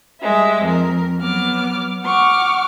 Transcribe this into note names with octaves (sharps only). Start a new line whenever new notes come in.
G3 G#3 E5
F2 A#4
F#3 B3 D6 F6
F#5 C#6 D6 F6